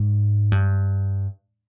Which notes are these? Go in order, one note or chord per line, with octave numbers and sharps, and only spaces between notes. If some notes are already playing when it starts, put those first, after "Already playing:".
Already playing: G#2
G2